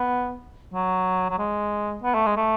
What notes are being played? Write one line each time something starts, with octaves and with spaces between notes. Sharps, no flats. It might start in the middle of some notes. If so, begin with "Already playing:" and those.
Already playing: B3
F#3
F#3
G#3
B3
A3
G#3
A3